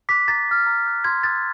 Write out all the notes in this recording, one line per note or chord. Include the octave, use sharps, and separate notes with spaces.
D6 F#6 B6
A#5 A6
D6 F6
A#5
D#6 F#6
C6 G#6
D#6 F#6 A6